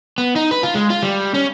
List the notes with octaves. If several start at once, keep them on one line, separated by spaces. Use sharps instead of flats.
B3
D#4
B4
F4
G#3
F4
G3
C#4